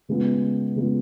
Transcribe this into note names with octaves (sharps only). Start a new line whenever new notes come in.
C#3 G#3 B3 F4
C#3 G#3 B3 F4